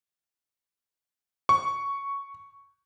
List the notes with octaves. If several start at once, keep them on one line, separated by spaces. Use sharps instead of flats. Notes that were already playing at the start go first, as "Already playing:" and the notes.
C#6